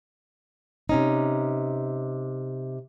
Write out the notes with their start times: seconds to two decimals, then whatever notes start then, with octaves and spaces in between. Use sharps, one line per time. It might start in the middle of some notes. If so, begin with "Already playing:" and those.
0.89 C3 C#4 D#4